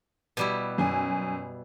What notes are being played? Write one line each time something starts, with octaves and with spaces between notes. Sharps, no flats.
B2 G3 E4
F#2 G#5